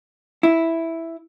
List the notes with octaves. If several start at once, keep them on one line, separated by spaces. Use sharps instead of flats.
E4